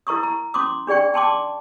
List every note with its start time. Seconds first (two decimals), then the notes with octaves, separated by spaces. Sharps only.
0.07 E4 A#4 A#5 C#6 D#6
0.23 A#5
0.54 C#4 C6 D6 D#6
0.87 D4 G#4 D5 G5 C#6
1.14 G5 A5 C6 D6